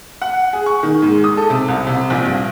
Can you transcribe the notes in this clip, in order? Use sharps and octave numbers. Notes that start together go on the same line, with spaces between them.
F#5
G#4
C#6
D#3
G#2
D#6
A4
C3
C2
C3
A#1
G2